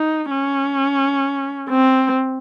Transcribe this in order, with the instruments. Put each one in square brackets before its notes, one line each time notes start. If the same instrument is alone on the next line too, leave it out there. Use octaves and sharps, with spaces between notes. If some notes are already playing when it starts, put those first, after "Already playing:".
Already playing: [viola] D#4
C#4
C4